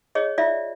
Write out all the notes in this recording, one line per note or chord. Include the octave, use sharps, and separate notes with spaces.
G#4 C#5 D#5
F4 D5 E5